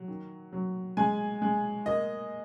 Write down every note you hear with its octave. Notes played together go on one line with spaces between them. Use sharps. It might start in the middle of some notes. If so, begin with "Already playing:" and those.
Already playing: F#3
D#3
F#3
G#3 G#5
G#3
A#3 D#5